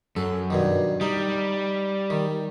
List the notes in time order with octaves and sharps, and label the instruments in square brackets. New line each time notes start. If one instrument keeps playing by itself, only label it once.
[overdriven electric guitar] F#2 [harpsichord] A4
[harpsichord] G2 B2 D#3
[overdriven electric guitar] G3 [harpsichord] D#4
[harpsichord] D#3